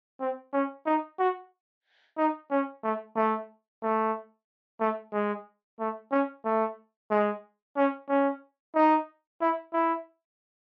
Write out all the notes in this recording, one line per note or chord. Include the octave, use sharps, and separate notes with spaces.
C4
C#4
D#4
F#4
D#4
C#4
A3
A3
A3
A3
G#3
A3
C#4
A3
G#3
C#4
C#4
D#4
E4
E4